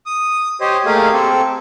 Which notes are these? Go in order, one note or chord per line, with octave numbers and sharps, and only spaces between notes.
D#6
G4 C5 C#5 D#5
A3 A#3 G4 G#4 D#5 F5
C4 A4